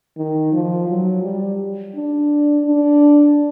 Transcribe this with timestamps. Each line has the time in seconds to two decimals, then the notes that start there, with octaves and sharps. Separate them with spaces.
0.17 D#3
0.53 F3
0.88 F#3
1.23 G3
1.95 D4
2.65 D4